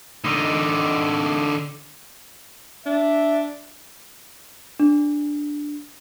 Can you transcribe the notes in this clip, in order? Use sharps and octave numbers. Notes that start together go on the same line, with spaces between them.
D3 D#4
D4 E5
D4